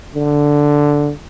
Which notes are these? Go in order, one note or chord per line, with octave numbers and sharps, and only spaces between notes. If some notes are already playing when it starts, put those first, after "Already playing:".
D3